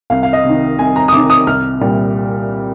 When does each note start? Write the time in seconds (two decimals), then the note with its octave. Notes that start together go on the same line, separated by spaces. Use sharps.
0.10 C2 F5
0.23 F5
0.33 D#5
0.44 C3 D#3
0.79 C2 G#5
0.96 A#5
1.08 D#6
1.13 C3 D#3 D6
1.30 D#6
1.47 C2 F6
1.81 A#2 G3